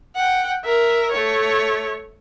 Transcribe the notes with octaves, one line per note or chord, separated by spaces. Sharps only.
F#5 G5
A#4 E5
A3 C#5